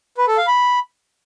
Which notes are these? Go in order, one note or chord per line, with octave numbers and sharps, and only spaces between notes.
B4
A4
F5
B5